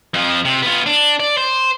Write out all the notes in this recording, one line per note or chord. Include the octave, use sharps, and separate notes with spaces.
F2 F3
C3
B3 F4
D4
D5
C5